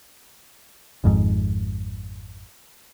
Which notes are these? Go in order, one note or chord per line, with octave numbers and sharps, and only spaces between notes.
G#1 F2 G#2